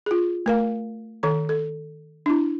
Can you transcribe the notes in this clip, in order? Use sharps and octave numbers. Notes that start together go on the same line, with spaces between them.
F4 G#4
A3 A#4 F5
D#3 A4 A#5
A4
D4 E4